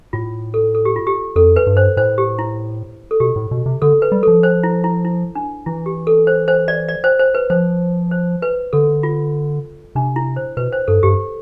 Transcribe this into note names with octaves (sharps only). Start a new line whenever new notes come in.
A2 F4
A4
A4
G4
F4
G4
F2 A4
B4
G2
C5
A2 C5
G4
E4
A4
B2 G4
A2
B2
C3
D3 A4
B4
G3
F3 A4
C5
E4
E4
E4
D4
E3 E4
G4
A4
C5
C5
D5
D5
C5
C5
B4
F3 C5
C5
B4
D3 A4
F4
C3 D4
E4
C5
B2 B4
C5
G2 A4
G2 G4